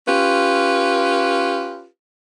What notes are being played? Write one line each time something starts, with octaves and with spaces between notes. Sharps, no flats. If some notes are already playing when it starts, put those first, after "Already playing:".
C#4 F4 G4 B4